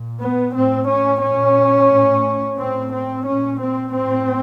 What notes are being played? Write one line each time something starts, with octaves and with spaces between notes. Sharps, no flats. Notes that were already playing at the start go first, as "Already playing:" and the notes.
Already playing: A#2
B3
A2 C4
C#4
A#2 C#4
A2
A2 C4
C4
A#2 C#4
C4
A2 C4